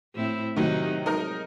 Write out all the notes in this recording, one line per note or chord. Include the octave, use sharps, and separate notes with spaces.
A2 C4 E4
C3 D#3 F#3 D#4
F#3 G#3 D#4 A#4 D#5